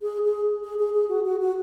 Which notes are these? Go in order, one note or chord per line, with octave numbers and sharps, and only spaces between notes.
G#4
G#4
G#4
G#4
G#4
F#4
F#4
F#4